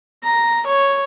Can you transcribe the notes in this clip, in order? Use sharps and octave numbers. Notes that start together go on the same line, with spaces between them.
A#5
C#5